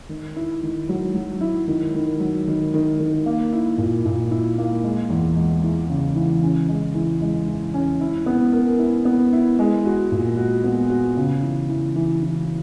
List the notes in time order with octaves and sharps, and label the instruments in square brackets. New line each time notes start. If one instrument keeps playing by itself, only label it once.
[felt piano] D#3
E4
D#3
F#3
F#3
E4
D#3
D#3
F#3
D#3
D#3
D#3
A#3
E4
A#2
A#2
E4
A#3
G#3
E2
G#3
E3
C#3
E3
C#4
G#3
E3
G#3
E3
C#4
E4
B3
A#4
E4
B3
E4
G#3
F#4
A#2
F#4
B3
F#4
C#3
E3
E3
E3
E3